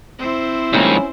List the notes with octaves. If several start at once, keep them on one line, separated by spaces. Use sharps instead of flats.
C4 E4 C5
G#2 D#3 F3 G3 A#3 C#4